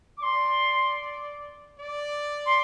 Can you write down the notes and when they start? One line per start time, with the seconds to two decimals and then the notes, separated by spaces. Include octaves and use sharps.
0.17 D6
0.22 D5 C6
1.79 D5
2.46 C6